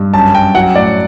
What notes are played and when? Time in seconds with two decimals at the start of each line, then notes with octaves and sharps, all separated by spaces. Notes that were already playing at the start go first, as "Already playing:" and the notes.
Already playing: G2
0.14 F#2 A5
0.35 F#2 G5
0.55 F#3 F#5
0.75 A2 D5